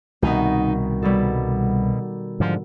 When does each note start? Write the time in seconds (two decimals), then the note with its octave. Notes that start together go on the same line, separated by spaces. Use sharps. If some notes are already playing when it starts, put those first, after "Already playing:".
0.22 C2 B2 D#3 B3 D#4
1.02 B2 G3 A4
2.40 G#2 D3 F3